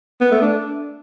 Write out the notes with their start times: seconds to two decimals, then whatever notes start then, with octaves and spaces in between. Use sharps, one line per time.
0.21 B3
0.31 A3
0.42 D4